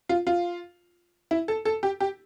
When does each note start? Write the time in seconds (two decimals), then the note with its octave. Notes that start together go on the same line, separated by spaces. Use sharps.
0.09 F4
0.27 F4
1.31 E4
1.48 A4
1.65 A4
1.83 G4
2.00 G4